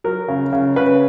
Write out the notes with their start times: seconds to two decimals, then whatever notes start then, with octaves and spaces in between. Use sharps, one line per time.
0.04 F#3 A#4
0.28 C#3
0.53 C#3
0.76 C#3 B4